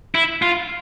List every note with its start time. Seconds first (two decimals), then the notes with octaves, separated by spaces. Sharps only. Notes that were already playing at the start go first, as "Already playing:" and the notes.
0.15 E4
0.42 F4